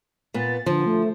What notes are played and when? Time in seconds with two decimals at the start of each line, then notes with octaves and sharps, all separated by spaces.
0.34 A#2 B3 A6
0.66 D3 F3
0.86 A3